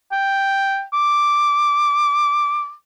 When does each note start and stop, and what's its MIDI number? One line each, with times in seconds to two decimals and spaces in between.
0.12 0.83 79
0.93 2.73 86